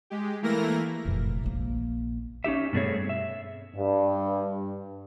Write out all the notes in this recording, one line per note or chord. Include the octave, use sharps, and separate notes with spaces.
G#3 G4
E3 A3 A#3 E4 A#4 A#6
F1 A#2
A#1 A#3
C#4 D#4 G4 E5
G2 B2 A3 C4 G#4 C#5
E5
G2